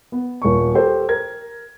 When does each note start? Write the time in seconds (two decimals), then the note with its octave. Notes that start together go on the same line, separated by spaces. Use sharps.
0.12 B3
0.42 D#1 C#6
0.75 G4 A4 A#4 C5
1.09 A#4 G#6